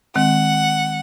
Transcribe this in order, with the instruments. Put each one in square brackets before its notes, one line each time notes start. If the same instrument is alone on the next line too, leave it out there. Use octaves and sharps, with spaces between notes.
[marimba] D#3 G#3 C4 [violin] F#5